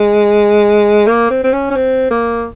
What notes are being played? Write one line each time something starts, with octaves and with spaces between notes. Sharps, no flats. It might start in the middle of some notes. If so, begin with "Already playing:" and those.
Already playing: G#3
A#3
C4
C4
C#4
C#4
C4
A#3